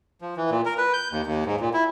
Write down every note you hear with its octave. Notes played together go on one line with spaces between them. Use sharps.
F3
E3
A#2
A#4
B4
G6
D#2
D#2
G#2
A#2
E4